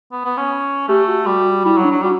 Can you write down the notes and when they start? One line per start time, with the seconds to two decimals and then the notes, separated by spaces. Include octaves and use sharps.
0.12 B3
0.25 B3
0.37 C#4
0.88 A3 G4
1.08 F#4
1.26 G3
1.65 G3 E4
1.77 F#3
1.84 D4
1.91 F#3
2.03 G3 F#4